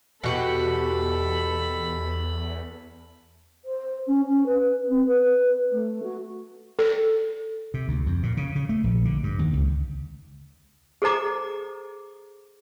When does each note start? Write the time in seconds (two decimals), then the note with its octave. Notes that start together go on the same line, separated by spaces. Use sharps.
0.24 E2 B2 F#4 G4 A4 B5
3.65 C5
4.06 C#4
4.29 C#4
4.45 B4
4.88 C4
5.06 B4
5.72 A3
6.02 F#4
6.79 A4
7.74 C3
7.88 D2
8.06 F2
8.23 A#2
8.37 C#3
8.56 C#3
8.69 A3
8.84 A#1
9.05 D3
9.23 G2
9.39 D#2
9.53 C#2
11.02 G#4 A4 C5 A#5 D6